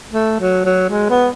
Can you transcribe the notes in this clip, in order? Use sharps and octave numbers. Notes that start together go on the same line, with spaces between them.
A3
F#3
F#3
G#3
B3